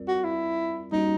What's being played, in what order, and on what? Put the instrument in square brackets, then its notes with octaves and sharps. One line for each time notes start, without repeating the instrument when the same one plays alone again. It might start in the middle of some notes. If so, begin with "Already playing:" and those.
Already playing: [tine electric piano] G3 C4 F4 A#4 D5
[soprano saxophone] F#4
E4
[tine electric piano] G3 A#3 C#4 F#4 [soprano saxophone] D#4